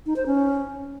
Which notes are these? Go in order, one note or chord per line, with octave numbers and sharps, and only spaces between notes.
D#4
C5
C#4